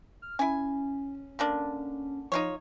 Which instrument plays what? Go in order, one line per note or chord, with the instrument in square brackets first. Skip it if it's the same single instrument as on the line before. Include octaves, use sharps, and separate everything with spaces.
[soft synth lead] F6
[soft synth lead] C#4 [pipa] E4 G#5
[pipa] D3 A#3 D4
[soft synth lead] F3 [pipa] D#4 F4 C#5